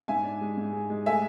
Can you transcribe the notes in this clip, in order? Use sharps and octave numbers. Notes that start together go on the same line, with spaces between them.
G#2 E5 G#5
D4
G#3
G#2
G#3
G#3
A3 E5 G#5